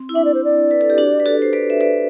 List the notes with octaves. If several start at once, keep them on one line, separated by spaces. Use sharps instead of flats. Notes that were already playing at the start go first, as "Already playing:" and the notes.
Already playing: C4
E4
D4 E5
D5
C5
D5
B4
A4
G4
D4 F#4
B4
F#4 A4
C5
B4 D5
E5
B4 D5